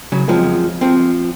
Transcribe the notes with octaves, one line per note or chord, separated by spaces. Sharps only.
C#3 F#3 C#5
F2 F3 F#3 G#3
F3 C4